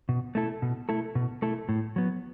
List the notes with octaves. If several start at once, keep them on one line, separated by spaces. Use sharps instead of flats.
B2
A3 E4 A4
B2
A3 E4 A4
B2
A3 E4 A4
A2
F#3 B3